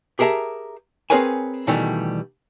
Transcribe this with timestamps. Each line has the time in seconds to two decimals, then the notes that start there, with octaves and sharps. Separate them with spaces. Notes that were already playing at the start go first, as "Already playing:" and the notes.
0.19 G4 G#4 A#4 E5 A5 A#5
1.10 C4 G#4 A#4 B4 C#5 G#5
1.67 B2 D#3 E3 G3 A3